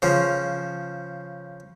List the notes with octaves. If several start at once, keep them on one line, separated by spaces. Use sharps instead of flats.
C#3 F3